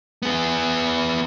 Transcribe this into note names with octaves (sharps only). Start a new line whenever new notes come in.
B3 G#4